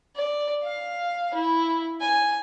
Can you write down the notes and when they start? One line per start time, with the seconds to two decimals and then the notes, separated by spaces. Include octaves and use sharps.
0.16 D5
0.63 F5
1.34 E4
2.01 G#5